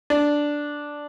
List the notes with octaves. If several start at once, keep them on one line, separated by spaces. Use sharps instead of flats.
D4